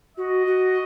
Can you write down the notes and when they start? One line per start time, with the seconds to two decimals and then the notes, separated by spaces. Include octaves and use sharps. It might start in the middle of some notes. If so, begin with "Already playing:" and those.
0.17 F#4 D#5
0.47 F#4